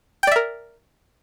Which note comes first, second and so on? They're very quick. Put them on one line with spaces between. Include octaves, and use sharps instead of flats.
G5 D5 E5 A#4